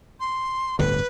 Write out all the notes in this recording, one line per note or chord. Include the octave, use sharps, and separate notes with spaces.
C6
D1 G1 D3 B4